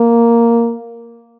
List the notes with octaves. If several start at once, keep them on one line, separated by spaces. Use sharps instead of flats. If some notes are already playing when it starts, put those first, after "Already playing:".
Already playing: A#3